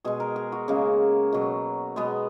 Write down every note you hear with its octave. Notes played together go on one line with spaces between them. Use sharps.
B2 G#3 G#4
A#4
G#4
F#4
C#3 G#3 A#3
B2 F#3
B2 G#3 B3